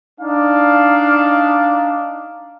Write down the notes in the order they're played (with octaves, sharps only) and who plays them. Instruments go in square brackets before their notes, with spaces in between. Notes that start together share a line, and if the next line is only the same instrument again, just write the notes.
[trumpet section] D4 D#4 F5